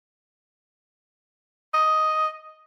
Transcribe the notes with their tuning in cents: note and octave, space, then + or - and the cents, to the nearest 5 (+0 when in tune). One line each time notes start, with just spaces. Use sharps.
D#5 +5